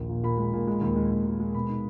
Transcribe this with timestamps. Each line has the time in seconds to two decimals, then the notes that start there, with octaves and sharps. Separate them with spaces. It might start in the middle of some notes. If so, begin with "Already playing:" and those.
Already playing: A#1 D#2
0.09 A#2
0.23 A#2 B5
0.37 G#3
0.53 A#2
0.67 G#3
0.81 D#2
0.96 G#3
1.11 D#2
1.26 G#3
1.39 G#3
1.55 B2 B5
1.69 D#4